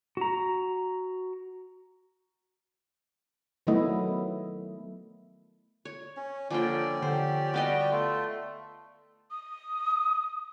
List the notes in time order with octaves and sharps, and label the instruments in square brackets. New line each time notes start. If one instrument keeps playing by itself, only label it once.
[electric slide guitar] F#4 A#5
[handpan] D#3 F#3 A3 B3 E4 D#5
[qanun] C#5
[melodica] C#4
[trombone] D3 [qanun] F3 A#3 G5 [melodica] C#4 D5
[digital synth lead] D3 [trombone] G4 [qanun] C5
[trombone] G3 [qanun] B3 D5 D#5 [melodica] F#4 G5
[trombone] A3 [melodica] F4
[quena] D#6